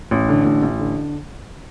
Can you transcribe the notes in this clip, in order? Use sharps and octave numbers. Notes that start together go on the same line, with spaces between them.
A1
D3
A1
A1
D3